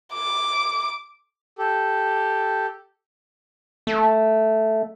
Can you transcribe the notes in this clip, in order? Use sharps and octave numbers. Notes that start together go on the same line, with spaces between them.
D6
G4 A4
A3